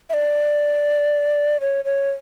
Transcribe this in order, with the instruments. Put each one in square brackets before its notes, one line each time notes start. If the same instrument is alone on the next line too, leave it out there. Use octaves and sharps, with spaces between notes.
[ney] E5
D5
C#5
C#5